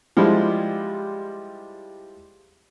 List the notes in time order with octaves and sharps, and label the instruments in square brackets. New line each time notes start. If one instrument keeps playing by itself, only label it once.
[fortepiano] F3 G3 G#3 E4